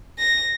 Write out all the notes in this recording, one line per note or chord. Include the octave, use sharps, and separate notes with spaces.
A#6